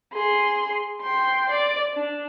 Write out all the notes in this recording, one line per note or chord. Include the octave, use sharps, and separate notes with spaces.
G#4 C6
G5 C6
D5
D4